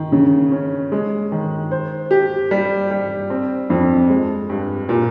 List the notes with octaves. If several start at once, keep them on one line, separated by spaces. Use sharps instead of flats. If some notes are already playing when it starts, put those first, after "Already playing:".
Already playing: D#3
C#3
C#4
G#3
D#3
C5
G4
G3
G3
C4
F2
G#3
G2
A#2